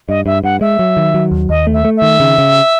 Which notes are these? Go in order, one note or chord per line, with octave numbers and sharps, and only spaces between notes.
G2 D#5
G2 E5
G2 F#5
G#3 E5
F#3
D#3
F#3
D#2
D#2 D#5
A3
E5
A3
E5
D#3
C#3
C#3